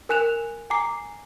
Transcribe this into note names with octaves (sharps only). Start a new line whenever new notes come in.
A#4 G#5 F#6 E7 F7
G#5 A#5 D6 C7